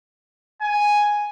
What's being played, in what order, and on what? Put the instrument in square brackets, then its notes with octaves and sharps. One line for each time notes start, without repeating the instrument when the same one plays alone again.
[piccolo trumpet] G#5